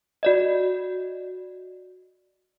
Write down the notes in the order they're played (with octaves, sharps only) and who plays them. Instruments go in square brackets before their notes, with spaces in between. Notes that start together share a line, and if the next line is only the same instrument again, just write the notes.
[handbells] F#4 D5 D#5